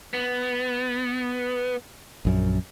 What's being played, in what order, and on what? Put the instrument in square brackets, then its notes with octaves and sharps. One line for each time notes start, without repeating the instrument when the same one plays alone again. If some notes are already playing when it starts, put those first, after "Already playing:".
[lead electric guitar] B3
[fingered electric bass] A#1 F#2